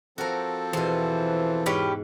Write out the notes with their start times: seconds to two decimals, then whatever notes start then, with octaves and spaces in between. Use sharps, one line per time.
0.18 F3 C4 F#4 A4 A#4
0.73 E2 B2 E3 C5
1.66 G#2 C#4 G4 B4